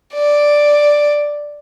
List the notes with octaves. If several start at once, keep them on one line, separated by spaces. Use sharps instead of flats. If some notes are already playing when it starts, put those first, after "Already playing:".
D5